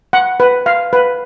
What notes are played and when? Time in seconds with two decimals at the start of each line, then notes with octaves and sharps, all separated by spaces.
0.13 F#5
0.40 B4
0.66 F5
0.93 B4